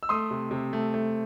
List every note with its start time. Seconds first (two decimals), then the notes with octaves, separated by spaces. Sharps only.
0.03 E6
0.09 A3 C6 D#6
0.31 C3
0.51 C3
0.73 A3
0.94 A3